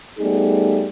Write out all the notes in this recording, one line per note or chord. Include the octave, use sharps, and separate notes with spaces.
G3 A3 B3 D#4 G#4